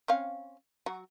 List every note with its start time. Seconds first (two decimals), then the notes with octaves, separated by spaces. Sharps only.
0.08 C4 C#4 F5
0.86 F#3 F#4